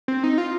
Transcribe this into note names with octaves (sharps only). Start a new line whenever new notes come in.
C4
D#4
F4